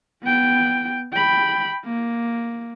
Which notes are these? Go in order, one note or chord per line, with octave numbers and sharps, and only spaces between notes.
B3 G5
G5 B5
A#3